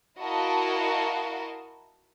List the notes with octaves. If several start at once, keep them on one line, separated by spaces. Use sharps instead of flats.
E4 F#4 A#4 D#5 F5 A5